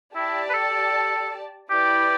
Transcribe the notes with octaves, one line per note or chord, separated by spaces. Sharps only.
E4 G4 D5 A5
B4
A4
E4 G4 B4 D5 G5